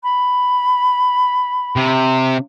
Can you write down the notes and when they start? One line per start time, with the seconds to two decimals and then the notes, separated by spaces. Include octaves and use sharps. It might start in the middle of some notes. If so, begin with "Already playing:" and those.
0.03 B5
1.76 C3